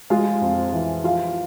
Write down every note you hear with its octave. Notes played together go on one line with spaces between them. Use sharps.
G#3 F4 F5
F2
E3
F3 F4 F5